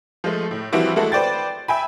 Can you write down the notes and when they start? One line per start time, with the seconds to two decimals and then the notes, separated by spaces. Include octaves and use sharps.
0.24 F3 G#3 A3
0.51 A2
0.73 E3 F3 G3 C4 E4 F#4
0.96 G#3 A3 E4 F#4 A4
1.12 B4 C5 D5 G5 A6
1.68 E5 G5 G#5 B5